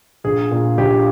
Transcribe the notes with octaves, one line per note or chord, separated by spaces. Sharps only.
A#1 G#4
A#2
A#1 G4